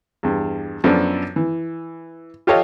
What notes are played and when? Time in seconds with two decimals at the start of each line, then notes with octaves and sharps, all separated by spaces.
0.23 E2 G2
0.84 F#2 F3 B3 D4 A4
1.36 E3
2.47 F4 G4 A4 C#5 D#5 F5